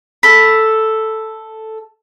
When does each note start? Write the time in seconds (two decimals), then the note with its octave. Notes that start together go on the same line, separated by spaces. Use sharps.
0.23 A4 B5